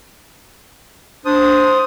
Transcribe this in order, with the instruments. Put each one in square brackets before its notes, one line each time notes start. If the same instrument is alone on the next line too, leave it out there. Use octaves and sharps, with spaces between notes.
[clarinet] D4 [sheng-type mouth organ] C5 D#6